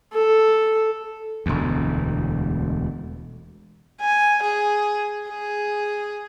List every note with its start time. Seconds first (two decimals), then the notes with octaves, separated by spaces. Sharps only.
0.13 A4
1.46 E1 D2
4.01 G#5
4.43 G#4
5.29 G#4